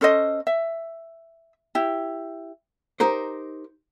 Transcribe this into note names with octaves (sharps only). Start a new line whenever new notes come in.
C#4 A4 C5 D#5
E5
E4 G4
D#4 G4 A#4 C5